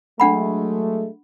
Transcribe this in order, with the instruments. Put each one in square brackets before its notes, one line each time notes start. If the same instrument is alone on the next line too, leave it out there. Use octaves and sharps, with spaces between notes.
[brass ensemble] F#3 G#3 A3 [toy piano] D4 F#5 B5